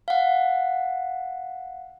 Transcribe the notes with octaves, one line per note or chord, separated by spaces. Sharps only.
F5 F#5